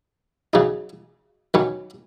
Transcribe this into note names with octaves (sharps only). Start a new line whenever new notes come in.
C#3 F#3 D#4
D#3 F#3 C#4